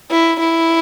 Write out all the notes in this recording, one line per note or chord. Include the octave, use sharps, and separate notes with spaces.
E4
E4